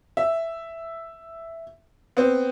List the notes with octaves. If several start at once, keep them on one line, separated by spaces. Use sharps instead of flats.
E5
B3 C4